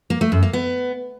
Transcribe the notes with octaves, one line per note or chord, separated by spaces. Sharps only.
A#3
A3
F#2
A#3
B3